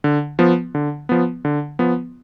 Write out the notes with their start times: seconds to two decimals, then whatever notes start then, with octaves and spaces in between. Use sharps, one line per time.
0.04 D3
0.39 F3 B3
0.75 D3
1.09 F3 B3
1.45 D3
1.79 F3 B3